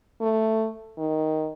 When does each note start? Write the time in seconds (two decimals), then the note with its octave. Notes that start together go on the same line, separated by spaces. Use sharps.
0.21 A3
0.98 D#3